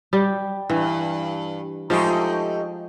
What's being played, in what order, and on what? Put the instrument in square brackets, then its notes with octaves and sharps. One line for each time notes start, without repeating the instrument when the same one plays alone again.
[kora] G3 G4
[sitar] G2 [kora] E3
[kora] F3 G#3 [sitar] A3 D#4 G4